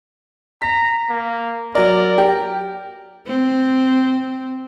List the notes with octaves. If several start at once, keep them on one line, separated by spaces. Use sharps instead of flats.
A#5 B6
A#3
F#3 A#4 D5
G4
C4